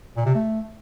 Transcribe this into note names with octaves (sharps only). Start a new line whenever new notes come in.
A#2
C3
A3